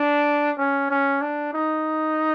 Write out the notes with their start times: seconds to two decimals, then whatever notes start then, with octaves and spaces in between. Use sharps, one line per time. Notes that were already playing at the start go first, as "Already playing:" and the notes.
Already playing: D4
0.58 C#4
0.90 C#4
1.21 D4
1.54 D#4